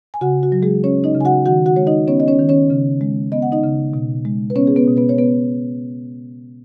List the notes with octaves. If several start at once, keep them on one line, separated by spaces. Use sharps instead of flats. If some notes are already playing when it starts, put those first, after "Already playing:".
G#5
C#3 F#4 F#5
F#4
F#3
G#3 G#4
C#4 C#5
D#4 D#5
C#3
G#5
F#4 F#5
D#3 F#4 F#5
F#4 F#5
G#3 C#5
D#4 D#5
B3 C#4 C#5
D#5
C#4 C#5
D#3
C#4 C#5
C#3
G#3
B3 D#5
F#5
D#4 D#5
C#3
B2
G#3
B4
B3 C#4 C#5
G#4
B3 B4
B2
B3 B4
C#5
B3 B4